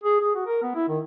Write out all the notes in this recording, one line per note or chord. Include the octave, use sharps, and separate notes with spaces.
G#4
G#4
F#4
A#4
B3
E4
D#3